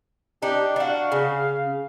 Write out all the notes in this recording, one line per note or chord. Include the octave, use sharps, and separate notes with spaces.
D4 D#4 G4
D4 F#4 F5
C#3